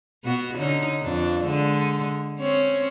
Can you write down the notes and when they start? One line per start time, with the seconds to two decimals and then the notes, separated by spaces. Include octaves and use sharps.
0.24 B2 B3 F#4
0.57 D3 C#4 D#4
1.03 F2 D4
1.45 D3 G#3
2.39 C4 C#4 C#5